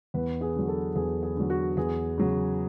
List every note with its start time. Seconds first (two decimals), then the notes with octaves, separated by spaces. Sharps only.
0.14 E2 B4
0.41 G#4
0.55 D3 F#3
0.68 A4
0.95 E2 G#4
1.23 G#4
1.36 D3 F#3
1.50 F#4
1.77 E2 G#4
2.18 C#3 F#3